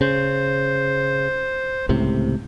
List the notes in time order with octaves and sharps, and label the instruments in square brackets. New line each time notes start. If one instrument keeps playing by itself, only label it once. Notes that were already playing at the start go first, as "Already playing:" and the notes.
[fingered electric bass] C#3 [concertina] C5
[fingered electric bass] C#2 A2 C3